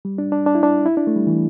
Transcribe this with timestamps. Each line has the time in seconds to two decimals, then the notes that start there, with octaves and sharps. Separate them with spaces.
0.05 G3
0.18 D4
0.32 D4
0.46 D4
0.55 E4
0.63 D4
0.86 E4
0.97 D4
1.07 A3
1.16 G3
1.27 E3